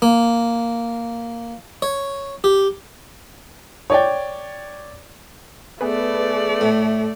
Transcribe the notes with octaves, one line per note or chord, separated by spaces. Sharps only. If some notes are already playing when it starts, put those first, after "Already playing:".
A#3
C#5
G4
C#5 D5 G5
A3 B3 G#4 B4 D5
A2